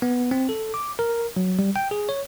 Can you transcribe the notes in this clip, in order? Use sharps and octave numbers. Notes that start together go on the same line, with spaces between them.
B3
C4
A4
D6
A#4
F#3
G3
G5
G#4
C#5